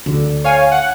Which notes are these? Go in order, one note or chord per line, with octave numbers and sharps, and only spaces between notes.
D2 D3
C#5 F5 G#5
F#5